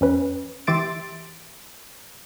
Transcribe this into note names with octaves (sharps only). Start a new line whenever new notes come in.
F2 C#4 B4
E3 G4 E5 C6 A6 D7